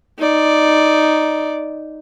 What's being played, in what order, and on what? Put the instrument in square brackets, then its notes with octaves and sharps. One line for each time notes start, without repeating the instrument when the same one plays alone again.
[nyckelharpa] D#4 D5